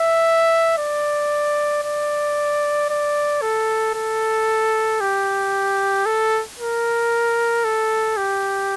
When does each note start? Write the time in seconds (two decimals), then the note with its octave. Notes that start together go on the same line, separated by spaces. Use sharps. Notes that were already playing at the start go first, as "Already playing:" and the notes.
Already playing: E5
0.78 D5
1.83 D5
2.90 D5
3.42 A4
3.95 A4
5.01 G4
6.06 A4
6.59 A#4
7.65 A4
8.17 G4